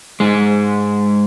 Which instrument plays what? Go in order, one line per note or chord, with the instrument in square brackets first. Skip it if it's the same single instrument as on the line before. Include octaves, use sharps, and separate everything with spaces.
[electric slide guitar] G#2 G#3